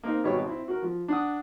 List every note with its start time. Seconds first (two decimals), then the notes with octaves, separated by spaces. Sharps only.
0.04 A#3 C4 D#4 A#4 F5
0.24 G#1 B2 G3 C#5 C#6
0.45 C4 E4
0.68 F#4 A#4
0.82 F3
1.08 D4 F#5 D#6